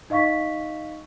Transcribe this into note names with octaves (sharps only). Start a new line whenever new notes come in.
D#4 D#5 F5 C#6 B6